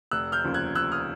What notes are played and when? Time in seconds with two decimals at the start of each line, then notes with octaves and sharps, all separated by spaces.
0.11 F1 E6 F#6
0.32 F6 G6
0.44 D#2 C#3 F3
0.54 F#6 G#6
0.75 F1 E6 F#6
0.92 D#6 F6